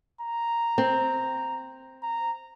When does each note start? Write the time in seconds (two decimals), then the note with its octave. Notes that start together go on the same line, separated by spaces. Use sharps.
0.21 A#5
0.78 C4
2.03 A#5